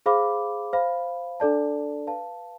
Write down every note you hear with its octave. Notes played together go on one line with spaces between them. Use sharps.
G#4 C5 F5 B5 D6
C5 F5 B5
D4 A4 D5 A5
B4 F5 A5